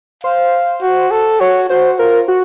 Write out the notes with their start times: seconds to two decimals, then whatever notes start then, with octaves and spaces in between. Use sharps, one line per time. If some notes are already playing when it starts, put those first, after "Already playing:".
0.23 C5 F5
0.82 F#4
1.11 A4
1.40 F#4 C#5
1.69 F#4 C5
1.99 F4 A#4
2.28 F#4